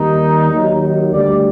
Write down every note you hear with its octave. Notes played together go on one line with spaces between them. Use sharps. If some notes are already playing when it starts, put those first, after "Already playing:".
Already playing: D#2 D#3 G3 D#4
D#2 D#3 F#3
D2 D3 G3 D5